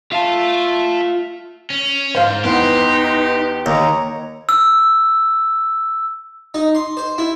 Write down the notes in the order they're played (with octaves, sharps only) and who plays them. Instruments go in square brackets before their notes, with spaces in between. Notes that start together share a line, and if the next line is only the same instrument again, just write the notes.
[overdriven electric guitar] F4 [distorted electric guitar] E5 A5
[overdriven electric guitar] C#4
[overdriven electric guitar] G#2 [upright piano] C5 F5
[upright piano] E2 B3 F#5 [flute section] D#4 B4 C6 [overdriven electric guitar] G4
[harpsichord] D#2 [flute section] C#5 A#5 C#6
[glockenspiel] E6
[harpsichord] D#4
C6
C5
E4